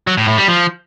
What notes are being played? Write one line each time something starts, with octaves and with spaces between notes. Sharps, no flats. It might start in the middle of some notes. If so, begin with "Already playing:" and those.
F#3
A2
A2
G3
F3